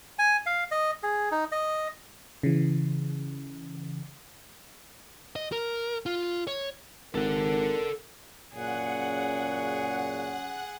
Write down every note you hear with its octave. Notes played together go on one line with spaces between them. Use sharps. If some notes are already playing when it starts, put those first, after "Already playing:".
G#5
F5
D#5
G#4
D#4
D#5
C#3 E3
D#5
A#4
F4
C#5
G#1 A4 A#4 F#5
F#2 A#2 C#3 C#4 G#4 F#5